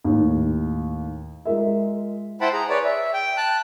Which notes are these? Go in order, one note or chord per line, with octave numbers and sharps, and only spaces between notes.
D#2 A2
G#3 F4 A#4 E5
E4 C5 F#5 G5 A5 B5
G#4 A#5
B4 C#5 D5
E5
G5
A5 F#6